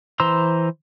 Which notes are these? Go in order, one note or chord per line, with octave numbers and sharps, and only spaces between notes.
E3 C5 A#5 C6 E6